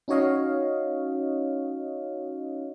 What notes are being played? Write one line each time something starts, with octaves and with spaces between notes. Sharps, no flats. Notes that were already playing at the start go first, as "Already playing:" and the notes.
C#4 D#4 F#4 C#5 D#5 F5